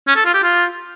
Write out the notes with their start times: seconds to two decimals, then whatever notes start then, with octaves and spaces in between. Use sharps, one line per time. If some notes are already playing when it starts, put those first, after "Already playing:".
0.07 C#4
0.16 A4
0.25 F4
0.34 G4
0.43 F4